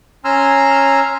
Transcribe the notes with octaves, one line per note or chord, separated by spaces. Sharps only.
C#4 G#5 A#5 C6 E6 F6